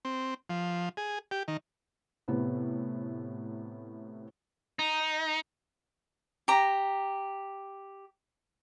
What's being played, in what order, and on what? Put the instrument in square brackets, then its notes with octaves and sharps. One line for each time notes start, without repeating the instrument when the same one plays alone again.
[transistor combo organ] C4
F3
G#4
G4
D#3
[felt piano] A2 C3 B3
[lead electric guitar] D#4
[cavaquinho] G4 A#5